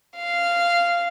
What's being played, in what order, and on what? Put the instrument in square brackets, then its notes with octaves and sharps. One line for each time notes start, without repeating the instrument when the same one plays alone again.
[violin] F5